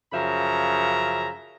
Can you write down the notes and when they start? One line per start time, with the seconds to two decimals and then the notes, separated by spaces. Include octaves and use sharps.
0.13 F#2 C#3 F3 E5 A#5